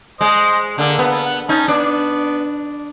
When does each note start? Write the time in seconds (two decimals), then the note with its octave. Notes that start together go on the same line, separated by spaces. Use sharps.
0.21 G#3 C5 D#5
0.78 D3 A#3 A4
0.99 B3
1.25 F#5
1.49 C#4 D#4 A5
1.68 B3 D4